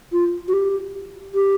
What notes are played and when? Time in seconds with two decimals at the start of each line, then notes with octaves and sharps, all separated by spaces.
0.13 F4
0.48 F#4
0.53 G4
1.34 G4